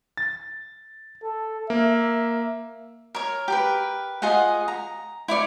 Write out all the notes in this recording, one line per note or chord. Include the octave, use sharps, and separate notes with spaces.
A6
A4
A#3 E5
A#4 C#5
G4 A#4 B4
F4 G#4 D#5 F#5
A#5
E4 C#5 D5 C#6